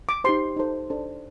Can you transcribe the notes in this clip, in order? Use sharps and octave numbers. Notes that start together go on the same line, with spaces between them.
D6
D#4 G4 C5 C6
D#4 A4 C5
D4 A4 C5